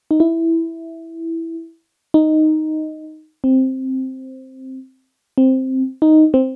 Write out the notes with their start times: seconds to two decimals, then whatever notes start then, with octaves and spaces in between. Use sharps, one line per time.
0.11 D#4
0.20 E4
2.14 D#4
3.44 C4
5.38 C4
6.02 D#4
6.34 C4